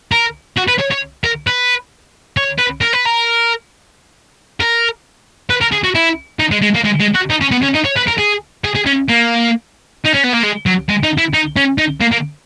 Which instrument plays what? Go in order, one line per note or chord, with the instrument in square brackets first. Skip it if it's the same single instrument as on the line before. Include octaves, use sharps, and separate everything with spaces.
[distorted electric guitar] A#4
F#4
B4
C#5
C#5
A#4
B4
C#5
B4
A#4
B4
A#4
A#4
B4
A#4
G#4
F#4
E4
D#4
G#3
G#3
A#3
G#3
G#3
F#4
D#4
C#4
B3
C#4
D#4
C#5
B4
A#4
G#4
G#4
G#4
C#4
A#3
D#4
C#4
B3
A#3
G#3
F#3
G#3
D#4
E4
D#4
C#4
D#4
A#3
A#3